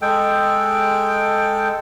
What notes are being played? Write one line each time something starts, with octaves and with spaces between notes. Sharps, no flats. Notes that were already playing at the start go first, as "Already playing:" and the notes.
G#3 A4 G5